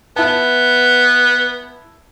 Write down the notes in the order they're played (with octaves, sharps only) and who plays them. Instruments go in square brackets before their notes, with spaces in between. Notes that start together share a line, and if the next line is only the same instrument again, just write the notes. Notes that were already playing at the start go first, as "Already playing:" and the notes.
[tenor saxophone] B3 [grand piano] E4 A5